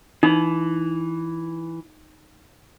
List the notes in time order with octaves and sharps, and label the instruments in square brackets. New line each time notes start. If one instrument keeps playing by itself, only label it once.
[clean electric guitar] E3 [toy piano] D#4